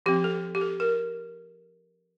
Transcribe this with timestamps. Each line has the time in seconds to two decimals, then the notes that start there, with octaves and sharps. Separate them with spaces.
0.06 F3 C4 G4
0.24 A4
0.55 G4
0.61 A4
0.80 A#4